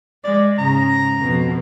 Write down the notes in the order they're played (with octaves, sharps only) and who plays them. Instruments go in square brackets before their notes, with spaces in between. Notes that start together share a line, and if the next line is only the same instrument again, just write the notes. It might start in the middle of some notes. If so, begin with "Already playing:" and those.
[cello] G#3 [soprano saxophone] D5
[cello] G#2 C#3 [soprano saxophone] A#5
[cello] F2 B2